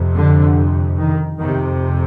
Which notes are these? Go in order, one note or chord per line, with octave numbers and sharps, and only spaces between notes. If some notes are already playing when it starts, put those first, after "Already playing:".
Already playing: F2 C3
D3
D#3
F2 C3 D#3